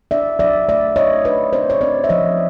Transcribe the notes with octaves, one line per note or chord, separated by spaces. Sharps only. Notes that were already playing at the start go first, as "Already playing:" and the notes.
D4 D5 E5
F#3 D5 E5
A3 D5 E5
A3 C#5 D#5
D4 B4 C#5
C4 C5 D5
C#5
C4 C5 D5
E5
F3 C#5 D#5